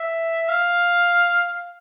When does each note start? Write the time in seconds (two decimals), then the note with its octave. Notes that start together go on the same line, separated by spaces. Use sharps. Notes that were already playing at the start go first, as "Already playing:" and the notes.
Already playing: E5
0.49 F5